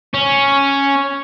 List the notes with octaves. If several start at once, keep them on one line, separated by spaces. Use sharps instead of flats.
C#4